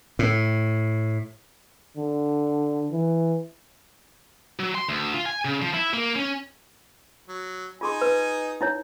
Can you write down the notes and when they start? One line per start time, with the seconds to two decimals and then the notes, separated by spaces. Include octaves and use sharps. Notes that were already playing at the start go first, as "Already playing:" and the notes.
0.19 A2
1.97 D3
2.92 E3
4.59 F#3
4.75 C6
4.88 D2
5.14 F4
5.26 G#5
5.45 C#3
5.62 F3
5.74 E4
5.93 A#3
6.16 C#4
7.28 F#3
7.81 D#4 F4 G#4 G#5 C6
8.01 B4
8.61 D#4 E4 C#5